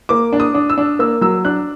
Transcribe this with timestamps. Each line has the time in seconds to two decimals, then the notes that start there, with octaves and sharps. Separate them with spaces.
0.09 A#3 D6
0.33 D4
0.40 D#6
0.54 D4
0.70 E6
0.78 D4
0.99 A#3 E6
1.21 F#3 E6
1.45 D4 F#6